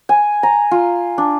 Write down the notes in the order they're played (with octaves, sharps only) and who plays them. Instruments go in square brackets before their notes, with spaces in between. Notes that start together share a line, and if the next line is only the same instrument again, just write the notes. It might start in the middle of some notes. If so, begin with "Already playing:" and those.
[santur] G#5
A#5
F4
D4